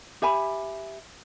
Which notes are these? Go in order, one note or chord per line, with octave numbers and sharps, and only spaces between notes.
G4 E5 G#5 B5